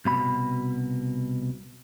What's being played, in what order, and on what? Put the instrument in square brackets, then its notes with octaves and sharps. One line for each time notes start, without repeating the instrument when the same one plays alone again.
[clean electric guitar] C2 B2 B5